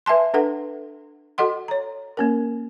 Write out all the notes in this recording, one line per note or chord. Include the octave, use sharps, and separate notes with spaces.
B4 E5 G#5 A5 C6
D4 A4 B4 F#5
F#4 A4 D#5 F#5 C6
C#5 A#5
A#3 C#4 A#4